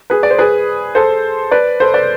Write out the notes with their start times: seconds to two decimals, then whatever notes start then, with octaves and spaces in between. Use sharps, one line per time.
0.10 G#4 B4
0.23 D5
0.31 C5
0.38 G#4 B4
0.95 A4 C5
1.51 B4 D5
1.80 A4 C5
1.94 B4 D5